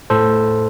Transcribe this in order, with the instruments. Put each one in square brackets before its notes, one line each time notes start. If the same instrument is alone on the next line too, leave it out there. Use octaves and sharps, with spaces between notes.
[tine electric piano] A2 A4 C5